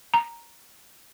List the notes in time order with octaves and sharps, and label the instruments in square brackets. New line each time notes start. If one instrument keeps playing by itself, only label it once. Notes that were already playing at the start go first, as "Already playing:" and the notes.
[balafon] A#5